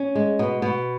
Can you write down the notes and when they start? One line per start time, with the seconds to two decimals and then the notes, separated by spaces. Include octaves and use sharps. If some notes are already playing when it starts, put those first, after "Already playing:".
Already playing: C#4
0.15 G#3
0.39 B2
0.62 B2